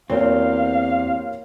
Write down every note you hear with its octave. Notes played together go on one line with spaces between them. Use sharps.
E2 A#3 C4 F#4 G4 C#5 F5